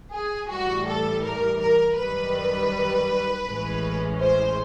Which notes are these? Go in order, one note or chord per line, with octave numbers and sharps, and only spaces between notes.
G#4
A2 E3 G3 F#4
A4
A#4
A#4
F#2 D#3 G3 B4
A1 A2 E3 G#3 C#4
C5